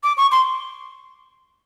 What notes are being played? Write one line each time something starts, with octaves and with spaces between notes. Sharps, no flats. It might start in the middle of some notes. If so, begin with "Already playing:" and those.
D6
C#6
C6